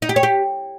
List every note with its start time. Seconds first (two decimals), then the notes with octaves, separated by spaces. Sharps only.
0.02 D#4
0.09 G4
0.16 C#5
0.23 G4